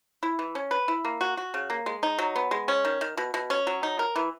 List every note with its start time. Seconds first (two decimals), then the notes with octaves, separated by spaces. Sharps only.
0.23 E4
0.39 E3
0.55 C#4
0.71 B4
0.88 E4
1.05 A#3
1.21 F#4
1.37 F#4
1.54 C#3
1.70 A#3
1.86 G#3
2.03 D#4
2.19 F#3
2.36 B3
2.51 G#3
2.68 C#4
2.85 D#3
3.01 D#3
3.17 B2
3.34 B2
3.50 C#4
3.67 F#3
3.83 D#4
3.99 A#4
4.16 E3